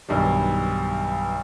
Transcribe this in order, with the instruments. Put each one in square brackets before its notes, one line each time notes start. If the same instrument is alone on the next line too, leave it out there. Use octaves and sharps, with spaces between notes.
[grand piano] B1 G2 D#3 G3